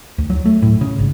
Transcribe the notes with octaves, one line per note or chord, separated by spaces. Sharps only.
D2
F#3
A3
A2
C#3
G#1